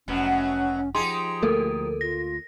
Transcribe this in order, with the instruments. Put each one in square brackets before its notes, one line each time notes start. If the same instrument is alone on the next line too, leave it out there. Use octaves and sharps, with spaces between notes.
[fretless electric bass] F1 [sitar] F#2 B2 F#3 [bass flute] C#4
[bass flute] F3 [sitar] D#4 G4 G#4 [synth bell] C6
[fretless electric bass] D2 A3 A#3 [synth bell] A4 A#4
[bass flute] F4 [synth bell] A#6